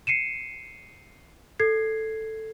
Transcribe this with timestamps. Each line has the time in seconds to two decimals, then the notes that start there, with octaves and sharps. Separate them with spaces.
0.07 C7 C#7 D#7 E7
1.59 A4 G#6 C7